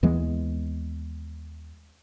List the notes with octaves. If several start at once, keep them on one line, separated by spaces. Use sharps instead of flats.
D#2 E3 G#3 B3